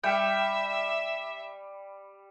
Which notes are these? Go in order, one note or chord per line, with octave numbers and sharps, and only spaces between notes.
G3 G4 E5 G5